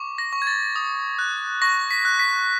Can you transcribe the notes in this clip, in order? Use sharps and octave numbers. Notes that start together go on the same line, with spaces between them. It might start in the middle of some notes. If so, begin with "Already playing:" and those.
Already playing: C#6 D6
A#6
C#6
G#6
A6
D#6
F#6
C#6 A#6
B6
F#6
B6